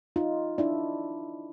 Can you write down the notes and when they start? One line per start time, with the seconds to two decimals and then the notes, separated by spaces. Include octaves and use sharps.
0.16 D#4 F4
0.58 D4 E4